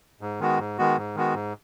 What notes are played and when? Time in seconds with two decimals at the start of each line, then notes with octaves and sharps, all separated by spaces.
0.21 G#2
0.40 D#3 G#3 B3 F#4
0.59 G#2
0.78 D#3 G#3 B3 F#4
0.97 G#2
1.15 D#3 G#3 B3 F#4
1.34 G#2